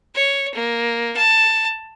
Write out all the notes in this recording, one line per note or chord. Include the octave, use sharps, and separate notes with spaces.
C#5
A#3
A5